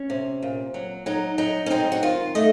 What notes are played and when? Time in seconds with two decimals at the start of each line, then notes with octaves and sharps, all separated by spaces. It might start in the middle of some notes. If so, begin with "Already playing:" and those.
Already playing: C#4
0.10 C3
0.43 A#2
0.74 F#3
1.06 F#3 D#4
1.38 F#3 D#4
1.66 C#4
1.70 C4 D#4
1.92 F#4
2.03 D#3 F4
2.35 A3 D#5